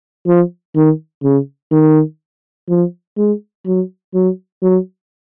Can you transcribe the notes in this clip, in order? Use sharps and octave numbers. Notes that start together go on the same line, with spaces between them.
F3
D#3
C#3
D#3
F3
G#3
F#3
F#3
F#3